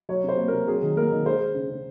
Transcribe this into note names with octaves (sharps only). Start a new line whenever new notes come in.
F#3 C#5
C3 C5
A#3
C3 A#4
F#3 G#4
D#3
A#3 A#4
D#3
G#3 C5
G#3
C#3
C#3